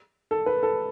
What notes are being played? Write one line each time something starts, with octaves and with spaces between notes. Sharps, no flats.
A4
B4
A4